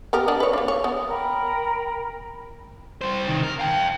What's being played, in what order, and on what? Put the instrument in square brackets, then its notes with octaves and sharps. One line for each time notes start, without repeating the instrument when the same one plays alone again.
[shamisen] B3 G4 A#4
B3 D4 D#5
B4 C#5
A#3 D4
C#5
B3
[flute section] A#4 G5 A#5 B5
[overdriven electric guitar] G3 C5
C3 D#3
A#4
F5 G5